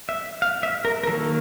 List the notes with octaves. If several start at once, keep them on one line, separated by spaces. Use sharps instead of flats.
E5
F5
E5
A#4
A#4
D#3 F#3 A#3 A4